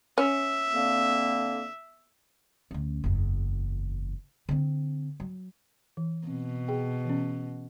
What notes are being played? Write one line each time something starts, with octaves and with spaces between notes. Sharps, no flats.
C#4 E5
D3 A#3 C4
D2 C#4
F#1 E2
D3 C4
F#3
E3
B2 C4
G#4 G5
E3 C#4